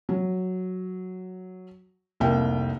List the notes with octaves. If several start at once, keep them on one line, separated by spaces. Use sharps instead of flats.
F#3
F1 C2 A#3 G5